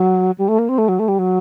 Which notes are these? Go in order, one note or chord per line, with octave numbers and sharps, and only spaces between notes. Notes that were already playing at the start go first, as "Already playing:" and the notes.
Already playing: F#3
G3
A3
A#3
C4
A3
F#3
A3
G3
F#3